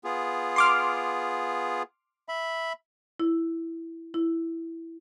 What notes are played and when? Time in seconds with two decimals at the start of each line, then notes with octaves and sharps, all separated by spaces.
0.04 B3 F4 G#4
0.56 C6 D6 F6
2.29 E5 B5
3.20 E4
4.14 E4